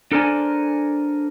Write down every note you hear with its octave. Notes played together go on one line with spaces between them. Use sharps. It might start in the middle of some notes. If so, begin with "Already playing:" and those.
D4 A4 A#4 C5 D5 G#5